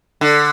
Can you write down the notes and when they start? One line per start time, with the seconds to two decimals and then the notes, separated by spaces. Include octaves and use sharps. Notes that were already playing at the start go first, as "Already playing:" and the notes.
0.21 D3